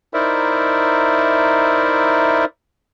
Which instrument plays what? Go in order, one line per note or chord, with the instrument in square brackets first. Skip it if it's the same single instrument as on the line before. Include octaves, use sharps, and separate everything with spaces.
[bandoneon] D#4 E4 A#4 C5 D5 E5